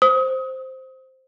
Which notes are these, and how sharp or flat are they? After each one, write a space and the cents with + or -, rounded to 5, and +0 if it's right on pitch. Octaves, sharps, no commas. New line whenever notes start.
C5 +0 D#6 +30